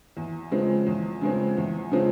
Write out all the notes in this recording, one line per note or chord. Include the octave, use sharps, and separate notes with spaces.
E2
C#3 F3 G#3 C4
E2
C#3 F3 G#3 C4
E2
C#3 F3 G#3 C4